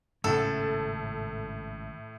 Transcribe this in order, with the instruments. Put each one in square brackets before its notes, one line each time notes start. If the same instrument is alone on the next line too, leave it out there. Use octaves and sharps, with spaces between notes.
[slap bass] G#1 C#3 C#4 [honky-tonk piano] A2 [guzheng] A4